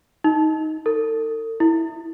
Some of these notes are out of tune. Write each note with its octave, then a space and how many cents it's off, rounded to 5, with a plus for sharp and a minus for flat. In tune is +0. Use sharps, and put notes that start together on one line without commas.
D#4 +15
A4 +45
E4 -15